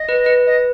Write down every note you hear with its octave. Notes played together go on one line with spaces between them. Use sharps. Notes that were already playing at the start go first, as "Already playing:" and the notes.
Already playing: D#5
B4
B4
D#5